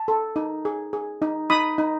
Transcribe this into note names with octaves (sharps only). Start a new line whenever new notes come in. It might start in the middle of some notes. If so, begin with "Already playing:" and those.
Already playing: A5
A4
D#4
G#4
G#4
D#4
D#4 B5 D#6
D#4